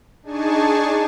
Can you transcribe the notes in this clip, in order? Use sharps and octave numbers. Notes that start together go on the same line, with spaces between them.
D4 D#4 G#4 G#5 A5 C#6